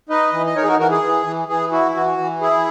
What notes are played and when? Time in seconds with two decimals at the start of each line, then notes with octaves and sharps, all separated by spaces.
0.09 D#4 B4 D#5
0.33 E3
0.46 D#5
0.56 D#4 A#4 C#5
0.63 G#4
0.67 F#4 A#4
0.79 E3 F#4 A#4
0.91 G#4
1.03 E3
1.26 E3
1.48 E3 G#4
1.72 E4 F#4
1.95 E3 F#4
2.18 E3
2.41 E4 G#4